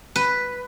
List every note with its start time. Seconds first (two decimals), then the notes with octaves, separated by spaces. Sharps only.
0.16 B4